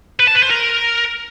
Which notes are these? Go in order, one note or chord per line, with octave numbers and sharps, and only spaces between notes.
B4
A5
B4
C5
A#4